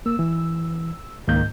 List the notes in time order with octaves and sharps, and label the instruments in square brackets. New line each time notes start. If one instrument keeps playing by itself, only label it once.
[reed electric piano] A#3 [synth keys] E6
[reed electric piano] E3
[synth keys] C#2 D#3 A#3 [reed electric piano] G#2 G6